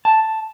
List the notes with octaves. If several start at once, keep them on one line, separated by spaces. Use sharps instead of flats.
A5